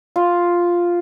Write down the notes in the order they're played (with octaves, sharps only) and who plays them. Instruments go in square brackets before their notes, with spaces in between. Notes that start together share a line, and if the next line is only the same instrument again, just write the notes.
[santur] F4